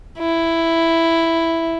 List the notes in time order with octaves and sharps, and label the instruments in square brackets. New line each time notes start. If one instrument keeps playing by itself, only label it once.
[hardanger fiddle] E4